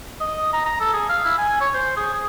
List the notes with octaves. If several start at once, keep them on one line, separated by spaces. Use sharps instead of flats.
D#5
A#5
A#5
A4
G#4
F5
E4
G#5
C#5
C5
G#4
G#4